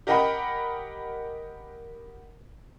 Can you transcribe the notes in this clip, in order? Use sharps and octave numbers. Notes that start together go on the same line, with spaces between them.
G4 A#4 D#5 F#5 G5 B5